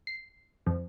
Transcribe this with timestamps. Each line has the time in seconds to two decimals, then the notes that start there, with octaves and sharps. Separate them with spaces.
0.07 C7
0.66 F2